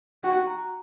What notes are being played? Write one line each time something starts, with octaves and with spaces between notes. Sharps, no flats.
F#4 G5
A#5